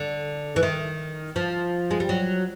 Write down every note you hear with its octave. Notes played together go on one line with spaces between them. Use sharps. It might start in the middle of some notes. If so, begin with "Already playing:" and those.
Already playing: D3
E3
D#3
F3
G#3
G3
F#3